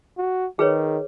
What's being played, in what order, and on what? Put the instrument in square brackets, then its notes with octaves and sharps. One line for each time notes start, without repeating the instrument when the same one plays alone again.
[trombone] F#4
[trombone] D#3 [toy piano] G#4 B4 C#5